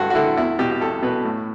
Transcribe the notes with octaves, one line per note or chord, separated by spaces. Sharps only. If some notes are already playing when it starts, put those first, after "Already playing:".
Already playing: G2 D3 F#4 A4
F#4
D3 E4
E2 E4
B2 G4
G4
E2 A4
B2 B4
A2